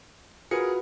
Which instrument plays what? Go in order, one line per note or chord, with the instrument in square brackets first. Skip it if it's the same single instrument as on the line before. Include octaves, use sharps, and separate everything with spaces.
[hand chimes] F4 F#4 B4 [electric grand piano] G#4 A#4 C#7